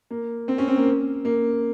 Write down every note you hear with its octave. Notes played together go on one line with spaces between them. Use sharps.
A#3
C4
C#4
C4
A#3
A#3